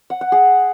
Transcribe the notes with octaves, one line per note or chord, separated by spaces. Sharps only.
F#5
F#5
G#4